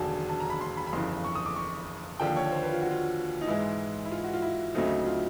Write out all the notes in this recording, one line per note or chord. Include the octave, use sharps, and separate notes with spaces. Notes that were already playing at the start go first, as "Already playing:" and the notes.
Already playing: E1 D#2 D3 F#3 G#5 A5
A5
A#5
B5
C6
B5
B5
G1 F2 C#3 E3 C6
C#6
D#6
D6
C#6
D#2 D3 F3 A#3 G5
C#5
C5
B4
F4
F#4
F4
D#4
G#2 E3 G#3 E4
E4
F4
F#4
F4
E4
D2 C#3 F#3 A3 C4 D#4
F4